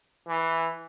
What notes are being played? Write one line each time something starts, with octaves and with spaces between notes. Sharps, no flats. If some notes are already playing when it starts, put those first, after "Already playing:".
E3